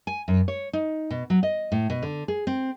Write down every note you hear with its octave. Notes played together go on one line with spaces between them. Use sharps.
G#5
F#2
C#5
D#4
B2
F#3
D#5
A2
B2
D3
G#4
C4